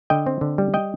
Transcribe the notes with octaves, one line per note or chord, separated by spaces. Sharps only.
D3 D#5 G5
C4
D3
G3
D#5 G5